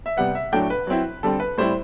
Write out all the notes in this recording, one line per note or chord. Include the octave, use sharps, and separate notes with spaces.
E5
C3 G3 B3 F#5
E5
A2 F#3 A3 D4 G5
B4
F#3 C4 E4
D3 G3 C4 A4
B4
A2 G3 C4 E4 C5